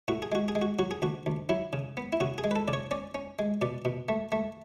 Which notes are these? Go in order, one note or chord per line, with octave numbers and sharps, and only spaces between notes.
A2 F#4
G#4
G#3 F#4
G#4
G#3
F#4
F#3 F#4
G#4
D2 F#4
D2
F#3 E4
C#3
B3
E4
C#3 F#4
G#4
G#3
B4
A4
C#3 D5
C#5
C#4 D5
C#4
G#3
B2 D5
B2
A3
A3